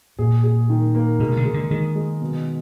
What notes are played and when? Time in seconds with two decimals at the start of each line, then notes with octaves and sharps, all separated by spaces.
0.19 A#2 G#4
0.44 G#4
0.69 D#3
0.95 A#3
1.20 B2 G#3
1.37 D3
1.45 G#3
1.54 D3
1.71 D#3 G#3
1.96 G#3
2.21 B2